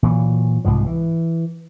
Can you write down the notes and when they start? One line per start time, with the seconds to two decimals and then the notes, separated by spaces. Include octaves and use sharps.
0.03 A#2 E3 F#3
0.65 C2 G#2 B2 F3
0.86 E3